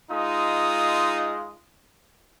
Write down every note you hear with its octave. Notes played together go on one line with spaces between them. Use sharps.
G#3 D#4 F4 D#6